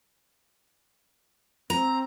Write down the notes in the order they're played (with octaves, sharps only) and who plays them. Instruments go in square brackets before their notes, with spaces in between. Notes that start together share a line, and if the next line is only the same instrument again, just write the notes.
[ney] C4 [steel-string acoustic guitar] A#5